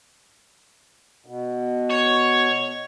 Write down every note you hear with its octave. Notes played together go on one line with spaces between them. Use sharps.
B2
C#5